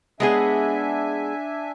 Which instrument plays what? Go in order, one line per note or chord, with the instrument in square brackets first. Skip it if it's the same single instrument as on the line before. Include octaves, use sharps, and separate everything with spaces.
[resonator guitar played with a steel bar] G#3 B3 G#4 [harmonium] D4 E5 G#5